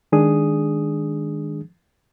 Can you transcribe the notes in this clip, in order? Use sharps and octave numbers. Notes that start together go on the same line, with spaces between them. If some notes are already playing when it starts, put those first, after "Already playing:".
D#3 G#3 D4 G#4 D#6